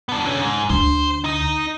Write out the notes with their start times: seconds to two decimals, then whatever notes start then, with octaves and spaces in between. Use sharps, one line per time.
0.09 B3 D4
0.25 D3 C#4
0.40 G#2
0.70 D2 D3 C5
1.24 D#4 D#5